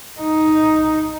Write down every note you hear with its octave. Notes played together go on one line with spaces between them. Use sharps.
D#4